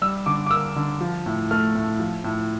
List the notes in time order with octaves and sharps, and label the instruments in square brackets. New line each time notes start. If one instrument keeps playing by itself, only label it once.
[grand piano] G3 E6
D3 D6
D6
A#3 E6
D3
F3
A2
A3 F6
A2
F3
A2